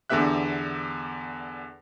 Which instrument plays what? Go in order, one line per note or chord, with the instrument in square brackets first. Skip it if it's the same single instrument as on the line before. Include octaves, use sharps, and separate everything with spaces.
[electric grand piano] E2 D3 B3 G4 E5 F#6